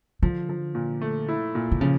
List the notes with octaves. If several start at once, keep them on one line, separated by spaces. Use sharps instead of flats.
D3 F3
F3
A#2
A3
E4
A#2
D3
C#3 F3